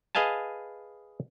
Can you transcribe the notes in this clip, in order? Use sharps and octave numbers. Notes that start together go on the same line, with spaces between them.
G#4 B4 D#5 F5 G#5 A5